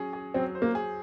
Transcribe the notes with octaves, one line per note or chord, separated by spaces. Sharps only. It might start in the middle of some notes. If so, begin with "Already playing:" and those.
Already playing: F#3 C#4 G#4
G#4
F#3 C4
C5
A#3
G#4